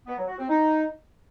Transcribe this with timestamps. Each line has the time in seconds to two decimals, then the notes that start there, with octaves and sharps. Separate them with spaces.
0.07 B3
0.17 F#3
0.28 F#4
0.38 C4
0.49 D#4